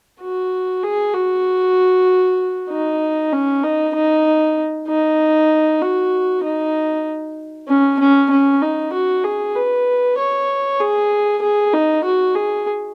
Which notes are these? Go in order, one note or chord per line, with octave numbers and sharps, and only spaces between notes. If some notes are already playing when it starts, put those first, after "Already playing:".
F#4
G#4
F#4
D#4
C#4
D#4
D#4
D#4
F#4
D#4
C#4
C#4
C#4
D#4
F#4
G#4
B4
C#5
G#4
G#4
D#4
F#4
G#4